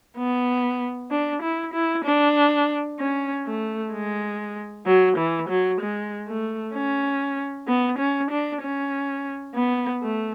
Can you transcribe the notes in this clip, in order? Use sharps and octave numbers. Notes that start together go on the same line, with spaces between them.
B3
D4
E4
E4
D4
C#4
A3
G#3
F#3
E3
F#3
G#3
A3
C#4
B3
C#4
D4
C#4
B3
A3